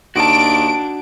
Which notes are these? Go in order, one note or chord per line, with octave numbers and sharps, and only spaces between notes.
D#2 D4 F#4 A5 D7